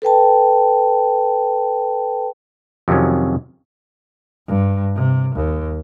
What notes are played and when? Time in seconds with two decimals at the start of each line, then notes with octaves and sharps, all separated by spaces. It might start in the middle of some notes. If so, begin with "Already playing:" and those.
0.02 A4 B4 G5 A5
2.88 F2 C3 D#3 F#3 C#4
4.48 G2
4.95 C3
5.35 D#2